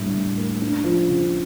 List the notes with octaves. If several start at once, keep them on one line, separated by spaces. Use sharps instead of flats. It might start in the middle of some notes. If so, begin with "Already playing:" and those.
Already playing: A2 G3 A#3 D4
A2
A#3
D4
F3
C#3